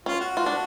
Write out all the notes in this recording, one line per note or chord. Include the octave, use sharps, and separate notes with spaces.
C#4 F4
F#4
F4
D4